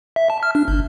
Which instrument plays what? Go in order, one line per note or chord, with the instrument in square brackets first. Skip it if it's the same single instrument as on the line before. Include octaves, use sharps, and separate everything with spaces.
[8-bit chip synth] E5
A5
F6
D4
G1